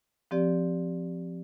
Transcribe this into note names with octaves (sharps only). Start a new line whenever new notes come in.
F3 C4 G4 D5